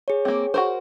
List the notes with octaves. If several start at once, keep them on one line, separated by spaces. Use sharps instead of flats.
G#4 C#5
A#3 C4
F#4 A#4 C5